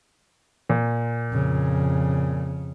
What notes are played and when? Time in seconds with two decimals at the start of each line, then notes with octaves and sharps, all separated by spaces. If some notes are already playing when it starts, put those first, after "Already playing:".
0.70 A#2
1.31 F2 C#3